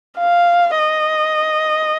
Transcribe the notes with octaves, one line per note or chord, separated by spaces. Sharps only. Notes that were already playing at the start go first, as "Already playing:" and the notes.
F5
D#5